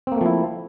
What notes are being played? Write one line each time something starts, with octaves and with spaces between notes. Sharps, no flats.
F3 A3 A#3 C4 E4